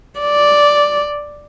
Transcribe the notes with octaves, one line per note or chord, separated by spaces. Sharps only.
D5